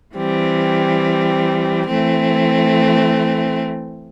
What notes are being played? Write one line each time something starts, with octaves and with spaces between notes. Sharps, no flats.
E3 G3 C4
E3 A3 C4